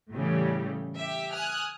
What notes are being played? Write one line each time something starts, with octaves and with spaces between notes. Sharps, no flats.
A2 C#3 E3 G3
G4 E5
G#5 D#6 F6 F#6